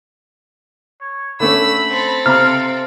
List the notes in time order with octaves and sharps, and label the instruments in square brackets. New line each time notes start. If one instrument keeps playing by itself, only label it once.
[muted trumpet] C#5
[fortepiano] D3 A3 C#4 [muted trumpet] B5 [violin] E6
[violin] C4 A4
[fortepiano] C3 A#5 [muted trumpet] F5 [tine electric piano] F6